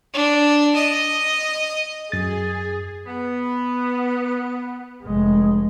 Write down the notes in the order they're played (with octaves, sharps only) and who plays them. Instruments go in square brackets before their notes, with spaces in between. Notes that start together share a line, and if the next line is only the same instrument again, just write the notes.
[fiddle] D4
D#5
[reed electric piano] F#2 A6 [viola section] G#4
[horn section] B3
[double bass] F1 G#3